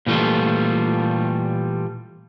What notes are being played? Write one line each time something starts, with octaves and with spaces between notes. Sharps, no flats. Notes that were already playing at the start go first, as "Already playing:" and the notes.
A#2 E3 G3 A3 F4